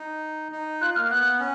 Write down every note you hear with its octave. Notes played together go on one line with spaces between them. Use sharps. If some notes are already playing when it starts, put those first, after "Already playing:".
Already playing: D#4
D#4
F4 F#6
A#3 F6
B3 F#6
C#4